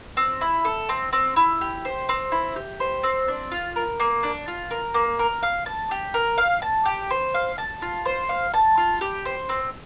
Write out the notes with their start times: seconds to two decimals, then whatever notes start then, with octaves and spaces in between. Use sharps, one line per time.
0.17 C4
0.41 E4
0.65 A4
0.89 C4
1.13 C4
1.36 E4
1.61 G4
1.85 C5
2.09 C4
2.32 E4
2.56 G4
2.80 C5
3.03 C4
3.28 D4
3.51 F4
3.76 A#4
4.00 A#3
4.23 D4
4.48 F4
4.71 A#4
4.94 A#3
5.19 A#4
5.43 F5
5.66 A5
5.91 G4
6.14 A#4
6.38 F5
6.62 A5
6.85 G4
7.10 C5
7.34 F5
7.58 A5
7.82 F4
8.05 C5
8.29 F5
8.54 A5
8.77 F4
9.01 G4
9.25 C5
9.49 C4